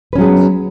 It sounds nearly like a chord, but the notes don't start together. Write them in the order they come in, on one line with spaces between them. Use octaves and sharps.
B4 C#4 F#3 G#4 B3